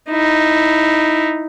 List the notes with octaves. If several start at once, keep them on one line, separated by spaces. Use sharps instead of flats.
D#4 E4